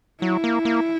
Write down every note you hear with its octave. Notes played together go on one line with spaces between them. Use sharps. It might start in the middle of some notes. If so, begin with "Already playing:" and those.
F#3 E4
A#3
A#3